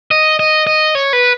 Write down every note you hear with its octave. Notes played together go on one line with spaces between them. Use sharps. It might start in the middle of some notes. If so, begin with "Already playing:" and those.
D#5
D#5
D#5
C#5
B4